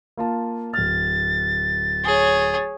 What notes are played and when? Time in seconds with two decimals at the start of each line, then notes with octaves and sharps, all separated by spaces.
0.17 A#3 F4 A5
0.74 D1 F6 A6
2.05 G#4 C#5